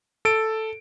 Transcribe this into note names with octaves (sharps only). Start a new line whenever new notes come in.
A4 D7